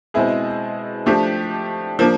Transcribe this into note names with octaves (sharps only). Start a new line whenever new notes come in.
B2 G#3 C4 E4 G#4
F3 A3 D4 G4
F3 A#3 D4